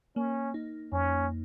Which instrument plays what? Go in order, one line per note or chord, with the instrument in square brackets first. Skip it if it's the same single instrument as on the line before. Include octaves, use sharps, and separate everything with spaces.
[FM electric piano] A#3 [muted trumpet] C#4
[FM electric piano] D#4
[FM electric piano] F2 [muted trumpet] C#4